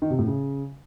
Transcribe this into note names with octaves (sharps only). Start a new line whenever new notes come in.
D#3
C3
A2
C#3